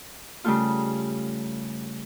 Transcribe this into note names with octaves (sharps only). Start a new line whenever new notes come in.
C#3 G3 A3 F4